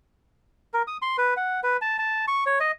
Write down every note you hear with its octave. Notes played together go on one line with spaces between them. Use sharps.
A#4
D#6
C6
B4
F#5
B4
A5
A5
C#6
C#5
D#5